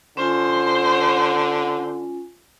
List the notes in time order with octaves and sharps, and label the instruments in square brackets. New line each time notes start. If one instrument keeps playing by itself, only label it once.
[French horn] D3 [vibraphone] C#4 F4 G#5 [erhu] C5